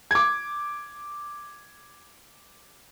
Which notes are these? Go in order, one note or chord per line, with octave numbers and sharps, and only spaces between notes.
D6 G#6